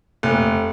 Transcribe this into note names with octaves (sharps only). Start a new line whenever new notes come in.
F1